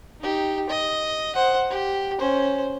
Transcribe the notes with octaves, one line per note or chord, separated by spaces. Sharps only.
D#4 G4
D#5
C5 F#5
G4
C#4 C5